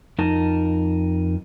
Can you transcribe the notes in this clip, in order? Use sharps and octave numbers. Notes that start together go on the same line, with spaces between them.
F2 D#4 A#4 A5